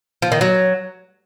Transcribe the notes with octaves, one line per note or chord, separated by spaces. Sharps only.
F3
D#3
F#3